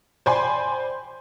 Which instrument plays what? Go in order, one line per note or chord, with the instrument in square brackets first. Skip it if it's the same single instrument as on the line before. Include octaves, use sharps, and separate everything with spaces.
[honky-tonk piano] C5 D5 G5 G#5 B5 C6